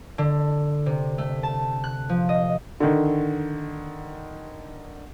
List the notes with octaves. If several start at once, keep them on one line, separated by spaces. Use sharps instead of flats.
D3
C3
A3
A5
F#6
F3
D#5
D3 D#3